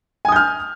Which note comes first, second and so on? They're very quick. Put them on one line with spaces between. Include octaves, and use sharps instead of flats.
G#5 D#6 G6 F6